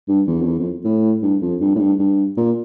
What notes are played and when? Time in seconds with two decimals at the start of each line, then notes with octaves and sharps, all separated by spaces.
0.08 G2
0.27 E2
0.41 F2
0.46 E2
0.59 F2
0.84 A2
1.22 G2
1.42 F2
1.61 G2
1.75 A2
1.80 G2
1.99 G2
2.37 A#2